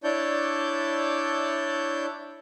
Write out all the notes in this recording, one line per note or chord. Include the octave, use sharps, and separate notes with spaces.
D4 E4 C#5 D5 A5 G6